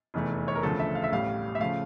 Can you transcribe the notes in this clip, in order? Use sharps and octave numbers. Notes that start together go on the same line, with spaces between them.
F1 E2 E3 A3
C#5
A#4
E1 D2 C#3 F3 A3 A4
E5
F5
E5
A1 A2 G3 F5
E5
C#3 F3 A3 F5